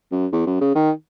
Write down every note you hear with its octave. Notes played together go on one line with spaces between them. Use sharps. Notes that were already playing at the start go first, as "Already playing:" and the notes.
F#2
E2
F#2
C#3
D#3